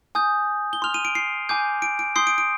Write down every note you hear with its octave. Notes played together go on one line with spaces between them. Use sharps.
G#5 D#6 G6
G7
C6 F6 F7
D#7
D7
C7
G#5 D6 G6
D7
D7
C6 D#6 G6 C7
D7
D7